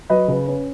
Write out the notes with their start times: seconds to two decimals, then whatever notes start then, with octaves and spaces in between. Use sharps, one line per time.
0.10 F#3 B4 D#5
0.28 C#3 B4
0.47 C#4 B4